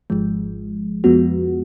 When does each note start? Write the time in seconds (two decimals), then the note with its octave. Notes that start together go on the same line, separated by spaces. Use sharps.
0.10 G#1 G#2 F3 G#3
1.04 F2 F3 G#3 B3 F#4